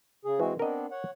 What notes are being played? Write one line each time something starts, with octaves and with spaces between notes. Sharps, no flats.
C#3 G#4
E3 G#3 C4 F#4
B3 C4 D4 A#4 D#5
C#5 F#5